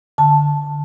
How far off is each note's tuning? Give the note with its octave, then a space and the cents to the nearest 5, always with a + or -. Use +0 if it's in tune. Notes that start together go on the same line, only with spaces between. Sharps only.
D3 +0 A5 +0